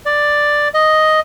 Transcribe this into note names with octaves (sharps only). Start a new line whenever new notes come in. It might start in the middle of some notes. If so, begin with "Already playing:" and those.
D5
D#5